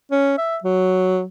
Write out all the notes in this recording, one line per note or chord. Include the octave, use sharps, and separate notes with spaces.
C#4
E5
F#3